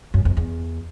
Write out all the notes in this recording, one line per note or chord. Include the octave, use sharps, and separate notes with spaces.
F#2
F2
E2